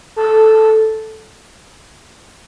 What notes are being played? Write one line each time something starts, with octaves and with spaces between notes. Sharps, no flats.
A4